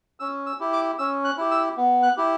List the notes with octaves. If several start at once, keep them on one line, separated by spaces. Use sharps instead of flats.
C#4 E6
E6
E4 G4
D6
C#4 E6
F#6
E4 G4
E6
B3
F#6
E4 G4